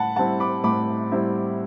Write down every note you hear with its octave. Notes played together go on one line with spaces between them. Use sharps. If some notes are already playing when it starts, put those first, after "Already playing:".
Already playing: A2 F#5 A5 B5
G3 C4 E4 F#5 A5
B5 D6
A2 B5 D6
G3 C4 E4